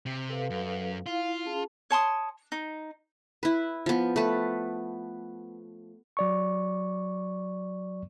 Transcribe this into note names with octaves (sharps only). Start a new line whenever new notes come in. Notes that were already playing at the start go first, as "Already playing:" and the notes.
C3
A4 B4 F5
F#2
E4 F4 F5
C#4 G#4 A5
C#5 A5 C6 D#6
D#4
E4 B4
F3 B3
A3 B4
F#3 D5 C#6